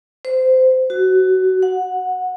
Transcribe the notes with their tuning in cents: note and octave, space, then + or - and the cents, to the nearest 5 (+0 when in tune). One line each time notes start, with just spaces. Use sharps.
C5 -20
F#4 +20
F#5 -15